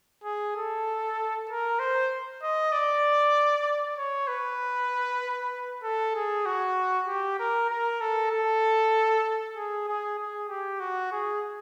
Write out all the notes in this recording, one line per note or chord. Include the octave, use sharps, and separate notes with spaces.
G#4
A4
A#4
C5
D#5
D5
C#5
B4
A4
G#4
F#4
G4
A#4
A#4
A4
A4
G#4
G#4
G#4
G4
F#4
G#4